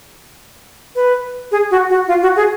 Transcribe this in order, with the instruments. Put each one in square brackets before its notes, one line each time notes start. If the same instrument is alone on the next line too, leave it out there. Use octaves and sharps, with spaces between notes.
[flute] B4
G#4
F#4
F#4
F4
F#4
G#4